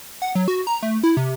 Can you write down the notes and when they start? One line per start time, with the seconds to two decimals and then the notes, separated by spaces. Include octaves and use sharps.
0.22 F#5
0.35 F#3
0.48 F#4
0.67 A#5
0.83 A3
1.03 E4
1.17 C3